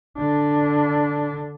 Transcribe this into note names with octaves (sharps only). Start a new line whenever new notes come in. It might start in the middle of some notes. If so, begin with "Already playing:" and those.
D3 D4